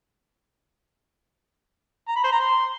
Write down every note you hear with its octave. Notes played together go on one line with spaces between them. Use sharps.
A#5
B5
C5
A#5
C6